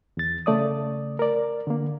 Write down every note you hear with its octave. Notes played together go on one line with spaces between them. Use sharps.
E2 A6
C#3 A3 D5 D#6
A#4 D5
D3 A#3